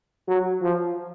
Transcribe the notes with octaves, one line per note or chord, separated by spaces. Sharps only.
F#3
F3